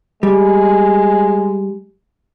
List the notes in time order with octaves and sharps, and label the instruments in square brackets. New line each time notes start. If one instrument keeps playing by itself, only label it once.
[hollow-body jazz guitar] G3 [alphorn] G#3